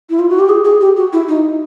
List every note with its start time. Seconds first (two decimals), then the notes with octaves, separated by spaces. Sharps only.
0.10 E4
0.19 F4
0.29 F#4
0.40 G4
0.49 G#4
0.65 G#4
0.81 G4
0.97 F#4
1.13 E4
1.28 D#4